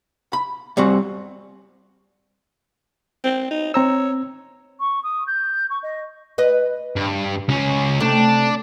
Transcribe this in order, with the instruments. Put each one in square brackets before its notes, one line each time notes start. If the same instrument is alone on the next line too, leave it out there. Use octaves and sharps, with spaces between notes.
[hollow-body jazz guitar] B5
G3 C4 F#4
[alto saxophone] C4
D#4
[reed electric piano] C4 A#5 E6 [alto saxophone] C#5
[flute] C#6
D#6
G6
C#6
D#5
[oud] B4 D#5
[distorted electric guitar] G2
C#2 C#4
[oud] C3 A3 [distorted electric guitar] D4